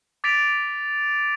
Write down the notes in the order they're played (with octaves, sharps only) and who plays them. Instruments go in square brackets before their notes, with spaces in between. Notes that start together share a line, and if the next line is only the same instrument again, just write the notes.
[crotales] D6 A6 B6 D7 F7